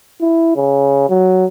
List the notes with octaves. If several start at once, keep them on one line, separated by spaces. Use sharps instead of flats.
E4
C#3
F#3